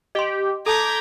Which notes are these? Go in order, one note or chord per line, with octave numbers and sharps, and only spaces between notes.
G4 D#5 C6
A4 A5 A#5 D6 G6 G#6 B6